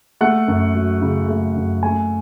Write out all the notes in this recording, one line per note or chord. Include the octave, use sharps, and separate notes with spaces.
A3 F#5
F#2
F#3
C#3
A3
F#2
A3 G#5